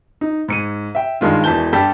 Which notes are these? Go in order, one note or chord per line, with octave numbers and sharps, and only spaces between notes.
D#4
G#2 C#7 D#7
E5 G5
G2 D#3 G#3 F4
E1 E3 A5 G6 G7
G2 G3 G4 A4 G6 B6